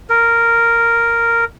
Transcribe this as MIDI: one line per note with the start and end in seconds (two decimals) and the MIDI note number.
0.10 1.45 70